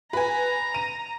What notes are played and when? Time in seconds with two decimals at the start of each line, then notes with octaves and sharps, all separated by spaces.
0.13 B4 G#5 A#5
0.74 D#7